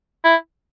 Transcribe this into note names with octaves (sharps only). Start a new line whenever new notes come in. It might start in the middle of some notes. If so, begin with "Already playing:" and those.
E4